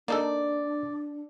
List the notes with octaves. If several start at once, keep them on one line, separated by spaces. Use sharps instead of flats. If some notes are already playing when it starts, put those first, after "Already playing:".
A#3 D4 D#4 A4 D5